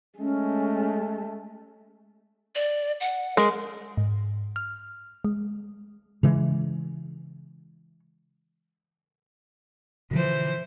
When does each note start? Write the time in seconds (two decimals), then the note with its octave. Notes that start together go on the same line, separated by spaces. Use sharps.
0.19 G#3 A3 C#4
2.55 D5
3.00 F#5
3.37 G#3 A#4
3.97 G#2
4.56 F6
5.24 G#3
6.23 C#3 E3 G#3
10.11 B2 D3 E3 F3 C5